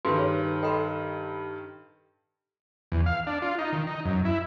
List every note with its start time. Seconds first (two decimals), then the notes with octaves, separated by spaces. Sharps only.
0.05 G2 D#3 G#4 A4 B4 C6
0.19 C#5
0.63 A4 D#5 G5 B5 C6
2.92 E2
3.06 F5
3.27 D4
3.42 F4
3.59 D#4
3.72 D#3
3.87 D#4
4.05 F#2
4.25 E4